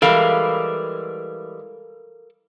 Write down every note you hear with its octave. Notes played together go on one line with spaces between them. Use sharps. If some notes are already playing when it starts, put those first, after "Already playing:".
E3 G3 G#3 A4 A#4 F5